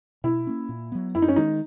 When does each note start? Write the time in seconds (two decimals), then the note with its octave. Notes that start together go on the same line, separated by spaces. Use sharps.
0.24 B2 E4
0.47 A#3 C#4
0.69 A#2
0.92 F#3 B3
1.15 F#2 E4
1.22 D#4
1.28 C#4
1.36 D#3 G#3 D#4